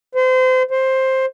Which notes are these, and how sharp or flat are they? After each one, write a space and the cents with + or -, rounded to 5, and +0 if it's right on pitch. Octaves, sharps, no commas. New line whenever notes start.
C5 -30
C5 +10